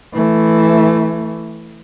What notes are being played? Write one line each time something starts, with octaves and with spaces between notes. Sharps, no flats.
E3 A3